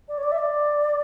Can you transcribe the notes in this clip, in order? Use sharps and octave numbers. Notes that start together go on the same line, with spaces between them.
D5
C#5
D5
E5
D5